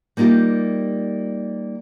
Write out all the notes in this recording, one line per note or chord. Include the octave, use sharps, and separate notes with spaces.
G3 A#3 D#4 F4 G4